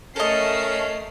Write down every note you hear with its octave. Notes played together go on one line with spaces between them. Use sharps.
A3 C#4 A4 A#4 C#5 D#5 C7